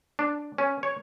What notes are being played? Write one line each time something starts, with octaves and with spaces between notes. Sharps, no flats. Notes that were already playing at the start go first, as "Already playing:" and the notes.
D4
C#4
C#5